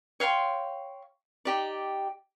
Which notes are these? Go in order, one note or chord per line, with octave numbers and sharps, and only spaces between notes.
C#5 F5 G5 C6
D#4 G4 D5